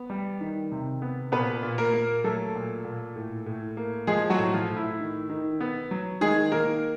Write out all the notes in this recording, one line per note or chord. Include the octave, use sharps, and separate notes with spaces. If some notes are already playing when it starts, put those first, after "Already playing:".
Already playing: B3
G3
D#3
C3
B3
A#2 B3 B4
A#2
A#3 A#4
A#3
F#3 A3 A4
A#2
A#2
A2
A2
A#3
F3 G#3 G#4
F#3 F#4
A2
F3 F4
A2
E4
D#3
D#3
B3
F#3
D#3 G#3 G#4
D#3 A#3 A#4